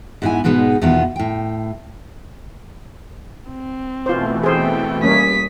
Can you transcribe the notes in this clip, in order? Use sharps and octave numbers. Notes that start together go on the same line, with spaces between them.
G#2 G3 B3 D#4 E4 G#5
G#2 B2 G#3 B3 D#4
E2 B2 D#3 B3 F4
A2 G5
C4
B2 E3 A3 F4 C5
C4 G#4 C5 G5
G3 A#3 C#4 D#6 B6